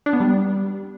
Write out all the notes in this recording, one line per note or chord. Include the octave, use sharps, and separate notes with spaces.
D4
B3
G3